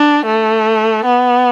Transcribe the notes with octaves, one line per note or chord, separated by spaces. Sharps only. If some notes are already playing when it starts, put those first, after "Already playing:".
Already playing: D4
A3
B3